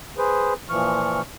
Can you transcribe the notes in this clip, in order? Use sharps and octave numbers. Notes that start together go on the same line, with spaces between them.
G#4 B4 C5
A#2 E3 F3 C#6 F6